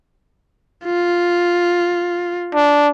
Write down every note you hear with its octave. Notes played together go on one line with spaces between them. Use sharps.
F4
D4